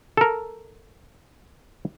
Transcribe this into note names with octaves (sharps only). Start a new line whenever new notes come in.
A4 A#4